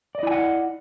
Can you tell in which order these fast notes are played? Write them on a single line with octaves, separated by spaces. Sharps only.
D5 D#5 E4 G#5 F#5